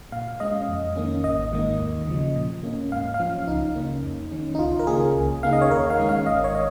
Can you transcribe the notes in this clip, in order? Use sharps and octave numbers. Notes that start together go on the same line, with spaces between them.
A#2 F5
G#3 C#4 D#5
F2
D#3 A#3 C#4
G#1 D#5
G#2 D#3 A#3
D#2
C#3 F3
A#2
A#3 C#4
G#2 F5
F5
F3 C#4
C#2 D#4
C#3 A#3 C#4
F2
D#3 C#4
D#4
C#2 F4
A#4
C#3 A#3 C#4 G#4
C#2
C#3 A#3 D#4 F5
D#5
C#5
D#2 A#4
F5
D#3 G#3 C#4
F5
G#1 D#5
C#5
D#5